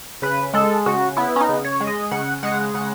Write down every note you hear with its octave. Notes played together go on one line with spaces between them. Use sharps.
C#3 B4
G#3 A4
C#3 F#4
B3 E4
C#4
D#4
C#3
C#5
G#3
D#5
C#3 F#5
G#3 F#5
C#3 F#5